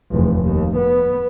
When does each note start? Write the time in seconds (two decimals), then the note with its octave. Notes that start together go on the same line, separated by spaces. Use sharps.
0.11 F1 E2
0.42 D#2
0.77 B3